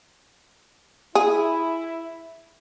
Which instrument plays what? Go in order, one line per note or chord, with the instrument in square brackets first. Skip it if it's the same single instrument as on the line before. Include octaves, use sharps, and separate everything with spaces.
[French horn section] E4 [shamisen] G#4